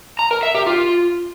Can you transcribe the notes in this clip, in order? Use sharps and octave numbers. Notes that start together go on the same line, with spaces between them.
A#5
A#4
E5
G4
F4